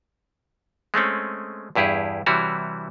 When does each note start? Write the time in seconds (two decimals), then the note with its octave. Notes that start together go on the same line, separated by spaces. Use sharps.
0.94 G#3 A3 C4 C#4
1.75 E2 G2 E4 G4 G#4
2.26 C3 E3 G3 E4 F#4 C#5